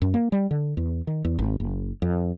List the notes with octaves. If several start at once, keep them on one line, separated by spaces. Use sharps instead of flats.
F#2
A#3
G3
D3
E2
D#3
E2
G#1
F#1
F2